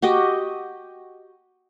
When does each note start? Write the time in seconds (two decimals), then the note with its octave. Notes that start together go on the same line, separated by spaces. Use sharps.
0.02 F#4 G4 D#5 G5